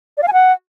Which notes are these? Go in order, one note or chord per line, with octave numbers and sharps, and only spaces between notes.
D5
F5
G#5
F#5